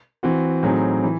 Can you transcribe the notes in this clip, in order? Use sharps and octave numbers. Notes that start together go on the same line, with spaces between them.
E3 C4 F#4
A2 F#3 C4 D#4 G#4
E3